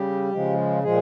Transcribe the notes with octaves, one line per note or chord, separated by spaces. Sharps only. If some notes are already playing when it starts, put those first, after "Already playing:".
Already playing: C#3 G3 G4
C#3 F3 G#3
A#2 F3 G#3 G#4